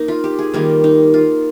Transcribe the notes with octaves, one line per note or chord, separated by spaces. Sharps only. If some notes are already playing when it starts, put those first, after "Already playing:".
Already playing: A#3 D#4
F4
G4
G#4
D#3 G3 A#3 F4
D#4
F4